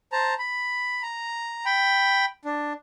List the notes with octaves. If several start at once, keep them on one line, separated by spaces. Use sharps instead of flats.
C5 A5 A#5
B5
A#5
G5 B5
D4